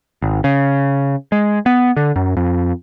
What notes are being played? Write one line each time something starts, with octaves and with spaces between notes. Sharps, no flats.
G#1
C#3
G#3
B3
D3
F#2
F2